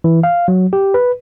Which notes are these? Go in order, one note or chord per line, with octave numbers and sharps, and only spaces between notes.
E3
F5
F#3
G4
B4